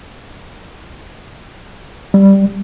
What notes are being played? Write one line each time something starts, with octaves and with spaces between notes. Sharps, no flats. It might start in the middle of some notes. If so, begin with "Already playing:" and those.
G3